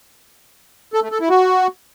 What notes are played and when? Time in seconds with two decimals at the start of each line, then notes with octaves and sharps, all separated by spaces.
0.94 A4
1.03 A3
1.12 A4
1.21 E4
1.30 F#4